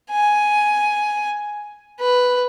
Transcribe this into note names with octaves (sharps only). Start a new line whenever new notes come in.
G#5
B4